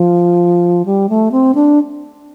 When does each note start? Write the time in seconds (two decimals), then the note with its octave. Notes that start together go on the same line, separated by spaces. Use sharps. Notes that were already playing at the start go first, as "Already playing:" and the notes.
Already playing: F3
0.86 G3
1.09 A3
1.32 C4
1.55 D4